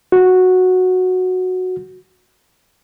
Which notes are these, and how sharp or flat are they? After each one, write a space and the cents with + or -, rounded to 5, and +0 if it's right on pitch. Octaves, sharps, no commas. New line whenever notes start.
F#4 -5